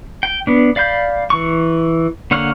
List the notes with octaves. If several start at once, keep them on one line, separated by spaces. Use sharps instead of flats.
G5
B3 D4
D5 F5 B5 G6
E3 C#6
D3 A#3 C#5 F#5 F6